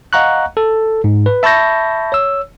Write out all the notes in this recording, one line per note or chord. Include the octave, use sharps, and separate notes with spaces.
D#5 F5 F#5 A#5 C#6 F#6
A4
G#2
B4
E5 A5 B5 C#6 G6 A#6
C#5 E6